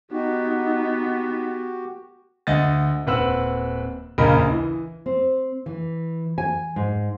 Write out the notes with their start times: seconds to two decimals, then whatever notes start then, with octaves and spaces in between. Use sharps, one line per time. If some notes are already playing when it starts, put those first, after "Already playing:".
0.11 B3 D#4 F#4 G4
2.47 D2 D#5 F#5 A6
3.07 D#1 C4 B4 F#5 E6 F#7
4.18 A#1 D#2 C#3 A#4 D#5 B5
4.49 E3
5.06 C4
5.66 E3
6.38 G#5
6.76 G#2